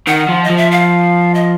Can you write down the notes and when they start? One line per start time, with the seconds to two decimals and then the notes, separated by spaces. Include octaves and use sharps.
0.07 D#3 F#5
0.28 F3
0.44 D#5
0.50 F3
0.57 E5
0.71 F5
1.34 D#5